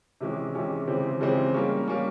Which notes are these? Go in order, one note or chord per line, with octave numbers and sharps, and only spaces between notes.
C3 E3 G#3 C#4 G4
C3 E3 G#3 C#4 G4
C#3 E3 G#3 C4 G4
C#3 E3 G#3 C4 G4
G3 A#3 C#4
G3 A#3 C#4